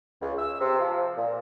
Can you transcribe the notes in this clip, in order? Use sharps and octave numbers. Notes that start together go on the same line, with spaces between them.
C#2
E6
C3
F3
A#2